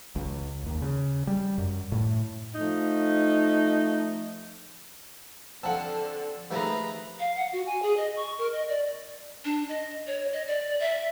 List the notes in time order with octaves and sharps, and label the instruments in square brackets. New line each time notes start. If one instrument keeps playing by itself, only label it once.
[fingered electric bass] C#2
D#2
C#3
G3
F#2
A2
[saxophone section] F3 A3 D#4
[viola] D3 A4 [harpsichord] F3 C4 [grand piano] F#5 A5
[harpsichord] D#2 F3 A3 [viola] G#4 [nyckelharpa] B4 A#5
[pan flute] F5
F#5
F#4
G#5
G#4
D#5
C#6
A#4
D#5
D5
D4
D#5
C#5
D#5
D5
E5